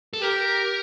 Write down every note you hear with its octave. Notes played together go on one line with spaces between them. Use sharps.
A4
G4 A#4